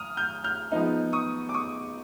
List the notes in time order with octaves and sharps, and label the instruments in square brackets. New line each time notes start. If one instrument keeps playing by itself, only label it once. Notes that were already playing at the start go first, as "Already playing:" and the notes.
Already playing: [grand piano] D#6 F6
F6 G6
F6 G6
F3 G#3 B3 D#4
C#6 D#6
D6
C#6 D#6